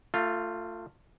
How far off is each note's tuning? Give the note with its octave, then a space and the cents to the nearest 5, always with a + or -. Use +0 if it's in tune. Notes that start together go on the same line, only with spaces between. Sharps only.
A3 +25 F4 +0